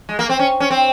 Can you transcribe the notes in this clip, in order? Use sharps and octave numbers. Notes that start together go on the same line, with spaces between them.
G#3
A#3
C4
C#4
C#4
C4